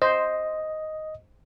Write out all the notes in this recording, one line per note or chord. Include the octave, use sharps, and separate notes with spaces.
C5 D#5